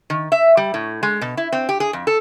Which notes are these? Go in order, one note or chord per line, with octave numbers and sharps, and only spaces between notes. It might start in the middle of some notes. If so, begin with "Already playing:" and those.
D#3
E5
G3
A2
G#3
B2
E4
C4
G4
G#4
F2
A4